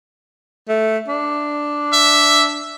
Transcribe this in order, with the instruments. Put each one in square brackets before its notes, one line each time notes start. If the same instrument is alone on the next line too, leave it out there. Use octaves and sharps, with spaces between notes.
[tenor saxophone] A3
D4
[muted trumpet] E5